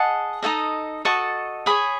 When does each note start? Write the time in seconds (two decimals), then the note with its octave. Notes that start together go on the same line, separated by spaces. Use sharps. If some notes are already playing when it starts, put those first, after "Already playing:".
Already playing: G#4 D#5 F#5 A5
0.42 D#4 F#4 A4 D#5
1.05 F#4 A4 D#5 A5 C#6
1.66 G#4 C#5 B5 D#6